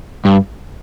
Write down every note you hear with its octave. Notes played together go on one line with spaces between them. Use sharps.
G2